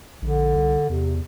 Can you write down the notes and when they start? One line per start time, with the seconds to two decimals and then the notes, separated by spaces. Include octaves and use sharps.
0.22 A#1 D3
0.55 C2
0.90 E2 C3